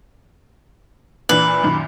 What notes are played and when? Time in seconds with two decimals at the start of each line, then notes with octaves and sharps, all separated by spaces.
1.29 A#2 E3 D4 B4
1.63 F#2 A#2 D#3